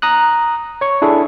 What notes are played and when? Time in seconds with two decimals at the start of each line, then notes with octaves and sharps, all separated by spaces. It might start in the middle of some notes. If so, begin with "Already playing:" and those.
0.02 A#5 D#6 F#6
0.81 C#5 C#6
1.02 D4 E4 G#4 A4